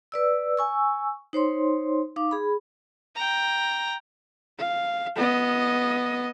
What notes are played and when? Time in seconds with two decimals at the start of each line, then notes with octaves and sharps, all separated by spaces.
0.12 B4 D5 E6
0.57 G#5 C#6 E6
1.33 D#4 C5 C#5 C6
2.16 D#4 F5 D6
2.31 G#4 B5
3.16 G5 A#5
4.58 F5
5.16 B3 D#5